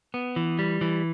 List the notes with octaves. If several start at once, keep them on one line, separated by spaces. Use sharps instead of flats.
B3
E3
G3
E3